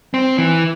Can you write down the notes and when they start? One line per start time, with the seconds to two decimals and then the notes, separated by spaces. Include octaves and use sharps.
0.14 C4
0.38 E3